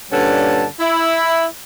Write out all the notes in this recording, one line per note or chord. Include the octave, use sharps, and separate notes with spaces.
G2 A#2 D3 C#4 A5
E4